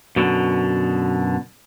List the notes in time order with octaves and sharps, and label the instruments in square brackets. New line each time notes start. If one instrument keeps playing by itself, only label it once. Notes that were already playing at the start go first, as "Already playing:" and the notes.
[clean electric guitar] F#2 B2 D3